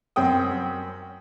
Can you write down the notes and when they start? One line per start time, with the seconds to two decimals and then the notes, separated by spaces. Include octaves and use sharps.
0.16 F#2 C4 G5 D#6